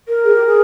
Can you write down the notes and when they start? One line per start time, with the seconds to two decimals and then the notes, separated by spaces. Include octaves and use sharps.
0.08 A#4
0.24 G#4
0.34 G4
0.45 G#4